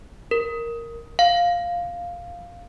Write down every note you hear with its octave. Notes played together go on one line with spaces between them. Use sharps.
A#4
F5